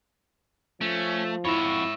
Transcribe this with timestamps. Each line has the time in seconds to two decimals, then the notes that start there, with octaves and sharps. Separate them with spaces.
0.81 F3 A3 C#4
1.45 F2 E4 F#4 C#5 E5 B5